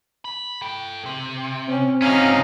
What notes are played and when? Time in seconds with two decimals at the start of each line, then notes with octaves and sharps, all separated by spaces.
0.25 B5
0.62 A4 G5
1.06 C3
1.68 C4 C#4
2.02 C3 C#4 D#4 F#4 F5